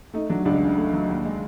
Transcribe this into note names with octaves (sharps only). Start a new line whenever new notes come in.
A3 D#4
F#3 D4
C#2 D4
C#3
A3
F#3
D#2
G#3